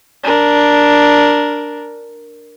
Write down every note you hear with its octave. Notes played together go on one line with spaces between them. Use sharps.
D4 A#4